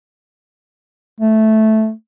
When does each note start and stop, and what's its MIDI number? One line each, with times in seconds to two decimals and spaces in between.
1.20 1.91 57